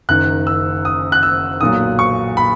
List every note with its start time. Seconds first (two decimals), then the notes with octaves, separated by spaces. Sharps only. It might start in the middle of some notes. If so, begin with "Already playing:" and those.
0.09 F#1 F#2 D#3 F#6
0.47 E6
0.85 D#6
1.12 F#6
1.23 E6
1.60 B1 A#2 F#3 D#6
1.99 C#6
2.37 B5